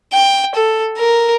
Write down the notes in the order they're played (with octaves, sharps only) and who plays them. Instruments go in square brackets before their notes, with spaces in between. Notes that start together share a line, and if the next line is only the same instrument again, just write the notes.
[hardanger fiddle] G5
A4
A#4